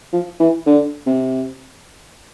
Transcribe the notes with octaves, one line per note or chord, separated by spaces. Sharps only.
F3
E3
D3
C3